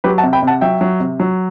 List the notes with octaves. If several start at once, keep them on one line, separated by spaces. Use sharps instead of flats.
F#3 G4 B4
F#5 A5
C3
G5 B5
C3
F#5 A5
F#3 E5 G5
F#3
C3
F#3